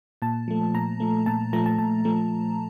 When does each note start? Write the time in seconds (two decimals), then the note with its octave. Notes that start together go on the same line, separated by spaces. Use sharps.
0.22 A#2 A5
0.48 F3 A3
0.74 A#2 A#5
1.00 F3 A3
1.26 A#2 A5
1.53 F3 A3 A#5
1.66 A5
1.78 A#2 A5
2.05 F3 A3